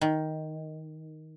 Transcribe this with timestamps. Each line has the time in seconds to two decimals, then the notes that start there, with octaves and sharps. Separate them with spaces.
0.01 D#3